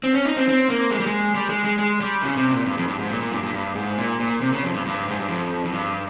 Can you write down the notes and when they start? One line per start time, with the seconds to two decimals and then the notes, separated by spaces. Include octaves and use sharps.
0.04 C4
0.15 C#4
0.25 D#4
0.37 C4
0.48 C4
0.70 A#3
0.91 G#3
0.99 G3
1.06 G#3
1.35 G3
1.50 G#3
1.64 G#3
1.79 G#3
2.01 G3
2.23 C#3
2.37 C3
2.51 A#2
2.66 G2
2.78 F2
2.88 G2
2.99 G#2
3.10 A#2
3.21 A#2
3.32 G2
3.43 G2
3.54 G2
3.75 G#2
3.98 A#2
4.20 A#2
4.41 C3
4.53 C#3
4.63 F2
4.74 G2
4.85 G2
5.08 G#2
5.19 G2
5.29 F2
5.65 F2
5.72 G2